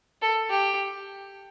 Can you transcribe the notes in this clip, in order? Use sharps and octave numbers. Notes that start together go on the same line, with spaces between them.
A4
G4